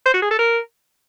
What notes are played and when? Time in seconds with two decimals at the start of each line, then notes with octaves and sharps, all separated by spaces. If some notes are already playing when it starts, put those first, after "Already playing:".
0.05 C5
0.14 F#4
0.22 G#4
0.30 A4
0.39 A#4